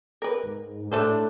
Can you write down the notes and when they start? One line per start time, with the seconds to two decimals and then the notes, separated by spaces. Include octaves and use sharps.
0.22 A#4 B4
0.44 G#2
0.91 A2 A3 D4 A4 C5